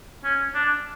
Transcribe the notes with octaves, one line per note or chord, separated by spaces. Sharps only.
C#4
D4